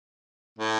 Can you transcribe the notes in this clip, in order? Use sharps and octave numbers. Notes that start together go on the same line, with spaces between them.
A2